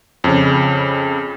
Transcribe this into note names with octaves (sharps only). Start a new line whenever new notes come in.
F2 C#3